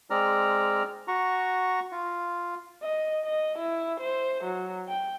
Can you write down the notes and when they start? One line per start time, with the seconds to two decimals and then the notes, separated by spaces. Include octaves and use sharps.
0.10 G#3 C4 D5 A#5 F6
1.08 F#4 A#5 C#6
1.92 F4
2.82 D#5
3.25 D#5
3.58 E4
4.00 C5
4.44 F#3
4.88 G5